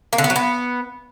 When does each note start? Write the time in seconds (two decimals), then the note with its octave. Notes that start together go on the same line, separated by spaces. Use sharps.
0.13 A#3
0.18 D3
0.24 B3
0.30 F#3
0.36 B3